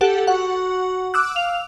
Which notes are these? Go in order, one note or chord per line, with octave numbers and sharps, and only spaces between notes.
G4 A4 F#5
F#4 F#5
D6 E6 F#6
F5 F7